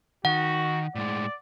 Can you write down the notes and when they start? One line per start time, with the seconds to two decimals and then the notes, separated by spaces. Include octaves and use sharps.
0.25 D#3 F#4 F#5
0.95 A2 G#3 D5